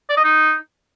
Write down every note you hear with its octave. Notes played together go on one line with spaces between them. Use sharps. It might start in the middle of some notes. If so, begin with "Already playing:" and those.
D5
D#5
D#4